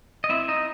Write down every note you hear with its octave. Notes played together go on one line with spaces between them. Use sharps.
D#5
C4 E4 E5
D#4 D#5